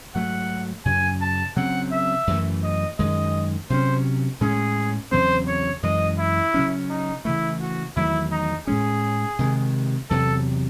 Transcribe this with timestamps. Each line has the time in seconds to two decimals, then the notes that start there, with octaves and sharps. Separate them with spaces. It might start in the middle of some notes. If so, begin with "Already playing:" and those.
0.15 G#2 F#3 A3 F#5
0.85 F#2 C#3 F#3 G#5
1.21 A5
1.56 C#3 F#3 C4 F#5
1.92 E5
2.27 F#2 E3 A3
2.63 D#5
2.99 F#2 D#3 G#3 D#5
3.70 C3 F#3 C#4 C5
4.41 A2 G#3 C#4 G#4
5.12 E2 C#3 F#3 C4 C5
5.47 C#5
5.83 F#2 E3 G#3 D#5
6.19 E4
6.54 C#3 F#3 C#4
6.90 D#4
7.25 C#3 E3 A3 E4
7.61 F#4
7.96 E2 D#3 F#3 A3 E4
8.31 D#4
8.67 A2 G#3 C#4 G#4
9.39 C3 D#3 G#3
10.10 E2 C3 F#3 A4